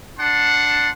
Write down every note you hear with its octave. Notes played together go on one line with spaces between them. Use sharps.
D4 F#5 A5 C6